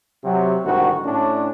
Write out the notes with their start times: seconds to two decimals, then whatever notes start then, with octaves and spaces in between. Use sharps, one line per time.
0.24 C3 F#3
0.64 C2 G#2 D3 D#3 F#4
1.05 A2 C#4 D4